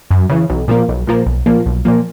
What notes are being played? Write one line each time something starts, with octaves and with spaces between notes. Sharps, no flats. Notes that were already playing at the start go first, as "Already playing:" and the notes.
F#2
C#3 E3
B1
A#2 F3 A#3
B1
A#2 F3 A#3
B1
A#2 F3 A#3
B1
A#2 F3 A#3